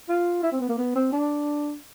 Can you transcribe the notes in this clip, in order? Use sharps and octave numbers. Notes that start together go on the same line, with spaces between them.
F4
E4
C4
B3
A#3
B3
C4
D4